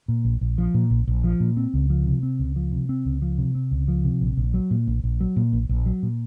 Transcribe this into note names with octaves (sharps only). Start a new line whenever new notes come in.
A#2
A#1
A#1
F3
A#2
A#1
A#1
F3
A#2
C4
C#2
F3
C3
C4
C#2
F3
C3
C4
C#2
F3
C3
C4
C#2
F3
C3
A#1
A#1
F#3
A#2
A#1
A#1
F#3
A#2
A#1
A#1
F#3
A#2